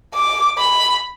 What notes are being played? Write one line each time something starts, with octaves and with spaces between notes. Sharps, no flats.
D6
B5